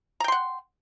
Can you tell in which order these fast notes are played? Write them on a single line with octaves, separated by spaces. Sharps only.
A#5 G5 C6 F#5